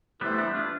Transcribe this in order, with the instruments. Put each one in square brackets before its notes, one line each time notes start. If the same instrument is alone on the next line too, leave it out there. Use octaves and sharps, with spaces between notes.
[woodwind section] E3 A3 E4 A4 C5 [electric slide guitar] G3 B3
[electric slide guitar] B3 D4
D4 F4